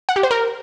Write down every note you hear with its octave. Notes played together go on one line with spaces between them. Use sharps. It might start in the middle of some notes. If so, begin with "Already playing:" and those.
F#5
G4
C5
A#4